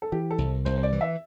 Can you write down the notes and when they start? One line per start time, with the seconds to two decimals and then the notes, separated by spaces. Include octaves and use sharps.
0.02 A4
0.12 E3 G4
0.31 A4
0.38 C2
0.65 C2 C5
0.78 C5
0.83 D5
0.92 E3
1.01 E5